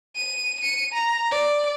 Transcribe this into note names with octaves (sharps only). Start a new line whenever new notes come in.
D#7
C#7 D#7
A#5
D5